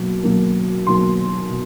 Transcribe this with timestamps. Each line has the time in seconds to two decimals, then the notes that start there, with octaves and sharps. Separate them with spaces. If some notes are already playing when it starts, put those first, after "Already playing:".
Already playing: B2 F#3 A#3
0.23 B2 F#3 A#3
0.87 B2 F#3 A#3 C6
1.50 B2